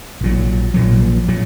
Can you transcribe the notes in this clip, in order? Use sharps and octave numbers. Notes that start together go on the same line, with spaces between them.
A#1 A#2 F#3
A#1 A#2 F#3
A#2 F#3